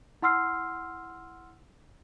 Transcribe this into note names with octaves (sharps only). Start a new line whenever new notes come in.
E4 F#5 C6 E6 F6 C7